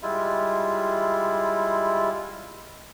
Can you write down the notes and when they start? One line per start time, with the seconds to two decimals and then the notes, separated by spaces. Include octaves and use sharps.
0.03 G3 G#3 E4 F4